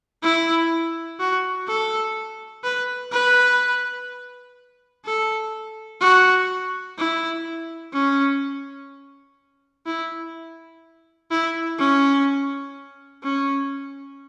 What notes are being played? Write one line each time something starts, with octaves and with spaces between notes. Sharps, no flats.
E4
F#4
A4
B4
B4
A4
F#4
E4
C#4
E4
E4
C#4
C#4